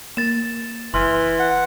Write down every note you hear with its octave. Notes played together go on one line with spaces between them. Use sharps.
A#3 A6 E7
F#1 E3 C6 F6
F#5